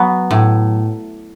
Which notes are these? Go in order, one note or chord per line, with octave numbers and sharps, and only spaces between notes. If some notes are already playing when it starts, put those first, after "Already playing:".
Already playing: F#3 B3
A2